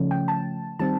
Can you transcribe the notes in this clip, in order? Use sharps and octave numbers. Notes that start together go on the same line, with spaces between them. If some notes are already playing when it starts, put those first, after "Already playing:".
Already playing: C#3 F3 A3 C#4
G5
A5
D#3 G3 C4 A5